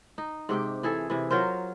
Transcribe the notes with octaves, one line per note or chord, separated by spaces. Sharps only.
D#4
G#2 C3 G4 G5
E3 G#4 A4
C3 E3
F#3 F4 A#4 C5